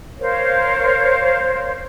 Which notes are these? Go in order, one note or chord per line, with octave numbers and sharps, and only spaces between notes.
A#4 C5 C#5 F5